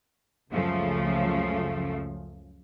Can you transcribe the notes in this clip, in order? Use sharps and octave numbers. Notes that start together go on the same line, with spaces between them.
C#2 F#2 C#3 F3 A3